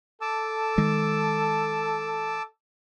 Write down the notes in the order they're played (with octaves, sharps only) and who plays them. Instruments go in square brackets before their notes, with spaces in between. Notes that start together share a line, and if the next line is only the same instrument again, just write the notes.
[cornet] A4 [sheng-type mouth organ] A5 D6 E6
[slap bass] D#3 G#3